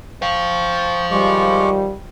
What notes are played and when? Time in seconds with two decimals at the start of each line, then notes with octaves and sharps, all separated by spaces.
0.22 C5 F5 G5 C#6
1.11 D#3 F3 G3 G#3 C#6 D6